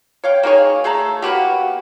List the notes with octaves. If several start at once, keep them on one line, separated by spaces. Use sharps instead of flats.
C#5 F5 G5
A#3 D#4 G#4 C#5
A3 G#4 A5 A#5
A#3 B3 F#4 G4